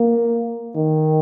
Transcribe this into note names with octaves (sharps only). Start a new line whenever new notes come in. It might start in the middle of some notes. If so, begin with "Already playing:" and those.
Already playing: A#3
D#3